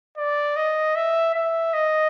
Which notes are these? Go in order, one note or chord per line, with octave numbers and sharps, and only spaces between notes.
D5
D#5
E5
E5
D#5